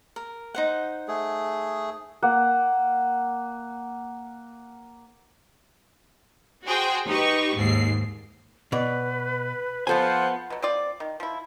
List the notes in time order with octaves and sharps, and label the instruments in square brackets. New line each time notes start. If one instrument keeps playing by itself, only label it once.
[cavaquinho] A#4
D#4 C5 F#5
[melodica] A3 G#4
[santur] A#3 F#5
[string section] F#4 G#4 C5 G5
D#4 G4 B4 C#6
D#2 G#2 C7
[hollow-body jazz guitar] B2 D5 [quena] B4
[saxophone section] F3 C5 [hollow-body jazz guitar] B3 A4 G#5 [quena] F#5
[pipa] B2 F#3
C4 F4 D5
D#3
F3 E4